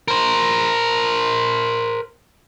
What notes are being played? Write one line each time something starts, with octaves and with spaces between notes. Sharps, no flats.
A#4 C5